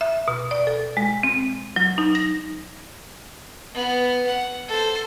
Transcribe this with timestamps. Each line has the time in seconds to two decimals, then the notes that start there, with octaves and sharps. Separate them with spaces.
0.01 E5
0.28 B2
0.51 D5
0.67 A4
0.97 G#3
1.23 C4
1.76 F#3
1.98 D#4
2.15 A#6
3.74 B3
4.27 F#5
4.68 A4 C5